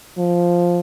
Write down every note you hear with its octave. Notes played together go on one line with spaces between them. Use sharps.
F3